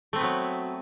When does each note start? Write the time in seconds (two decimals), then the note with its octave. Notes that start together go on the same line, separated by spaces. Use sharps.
0.13 A3
0.16 C4
0.18 B4
0.21 B3
0.23 F#3